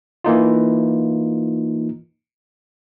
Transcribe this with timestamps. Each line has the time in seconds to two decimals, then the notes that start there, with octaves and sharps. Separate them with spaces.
0.24 E3 A#3 D#4 F4